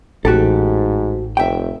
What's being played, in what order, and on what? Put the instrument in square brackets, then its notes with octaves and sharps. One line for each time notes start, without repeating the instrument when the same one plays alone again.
[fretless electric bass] A1 [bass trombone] G#2 [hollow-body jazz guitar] F#4 G4 A4
[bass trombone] F1 [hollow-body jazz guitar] E5 G5